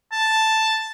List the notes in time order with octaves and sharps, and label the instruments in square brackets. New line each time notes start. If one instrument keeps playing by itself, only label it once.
[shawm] A5